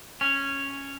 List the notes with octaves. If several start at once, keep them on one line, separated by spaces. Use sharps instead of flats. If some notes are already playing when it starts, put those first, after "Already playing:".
C#4